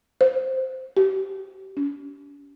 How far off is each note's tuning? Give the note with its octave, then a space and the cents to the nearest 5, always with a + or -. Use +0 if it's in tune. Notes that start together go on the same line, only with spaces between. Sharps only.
C5 +0
G4 -30
C#4 +45